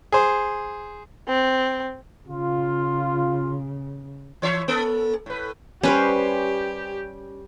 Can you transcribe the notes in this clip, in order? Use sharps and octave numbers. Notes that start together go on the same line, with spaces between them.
G#4 C5
C4
C#3 F4
E3 C#5 E5
A#3 A4
A2 B4
G3 C#4 G4 B4 C5